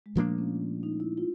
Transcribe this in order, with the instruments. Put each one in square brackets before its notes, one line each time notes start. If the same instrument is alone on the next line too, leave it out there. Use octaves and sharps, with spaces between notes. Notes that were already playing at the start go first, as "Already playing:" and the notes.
[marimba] G#3
[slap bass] A#2 F3 A#3 D4 [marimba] A3
[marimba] C#4
D#4
E4
F4